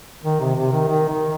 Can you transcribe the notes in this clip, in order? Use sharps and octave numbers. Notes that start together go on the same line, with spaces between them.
D#3
C3
C3
D#3
D#3
D#3